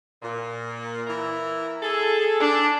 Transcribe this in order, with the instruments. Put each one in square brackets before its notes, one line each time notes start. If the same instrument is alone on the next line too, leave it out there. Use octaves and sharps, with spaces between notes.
[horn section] A#2
E3 E4 A#4
[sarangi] G#4 [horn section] A4
[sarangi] D4